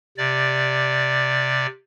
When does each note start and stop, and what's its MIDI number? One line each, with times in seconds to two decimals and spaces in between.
0.18 1.67 48
0.18 1.67 74